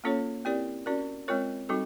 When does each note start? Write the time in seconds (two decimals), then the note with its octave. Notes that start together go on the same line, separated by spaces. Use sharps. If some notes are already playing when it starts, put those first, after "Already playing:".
0.04 A#3 C#4 F4 A4 C#5
0.45 C4 E4 G4 A#4 D5
0.86 C#4 F#4 A#4 D5
1.28 G#3 C4 F4 A#4 C#5
1.69 G3 C4 D#4 F#4 A4